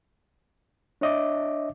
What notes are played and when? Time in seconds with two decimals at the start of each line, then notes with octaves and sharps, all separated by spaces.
1.01 D4 C#5 D#5 E5 D6